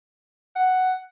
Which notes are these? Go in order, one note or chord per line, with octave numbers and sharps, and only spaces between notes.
F#5